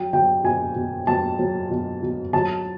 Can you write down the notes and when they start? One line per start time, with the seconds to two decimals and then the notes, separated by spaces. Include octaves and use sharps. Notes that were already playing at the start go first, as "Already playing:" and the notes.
Already playing: F#3 G5
0.13 F#3 G5
0.44 B2 G#5
0.75 B2
1.07 F#3 A5
1.39 F#3
1.70 B2
2.02 B2
2.33 F#3 A5